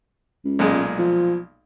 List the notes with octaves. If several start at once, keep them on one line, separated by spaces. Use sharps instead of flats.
C#2
B1 A#2 G#3
F3